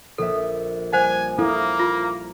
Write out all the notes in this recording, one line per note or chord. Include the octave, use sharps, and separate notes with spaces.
A#1 A4 E5
G3 C5 F#5 G#5
A#3 E4 A4 D6
F4